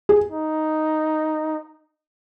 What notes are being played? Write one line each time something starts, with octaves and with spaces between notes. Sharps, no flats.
G#4
D#4